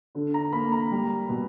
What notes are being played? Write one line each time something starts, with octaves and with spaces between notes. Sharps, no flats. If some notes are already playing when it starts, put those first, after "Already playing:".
D3
A#5
A#3 B5
A#5
G3
B2